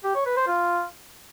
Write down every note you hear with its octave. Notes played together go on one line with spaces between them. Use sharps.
G4
C#5
B4
C5
F4